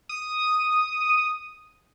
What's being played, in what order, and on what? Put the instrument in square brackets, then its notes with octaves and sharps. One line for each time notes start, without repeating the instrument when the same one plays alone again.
[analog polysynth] D#6 D#7